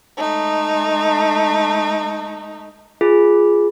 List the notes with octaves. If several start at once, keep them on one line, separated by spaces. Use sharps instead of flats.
G#3 A3 D#4
F4 G#4